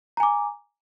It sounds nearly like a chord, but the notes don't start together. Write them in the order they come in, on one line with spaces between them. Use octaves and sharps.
A#5 G#5 D6